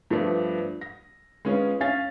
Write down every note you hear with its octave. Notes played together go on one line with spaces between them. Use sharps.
G2 F3 A3 B3 D4
A#6
G#3 B3 C#4 F4
C#4 F5 G#5 A6